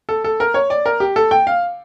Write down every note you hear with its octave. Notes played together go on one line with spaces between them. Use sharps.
A4
A4
A#4
C#5
D5
A#4
G4
A4
G5
F5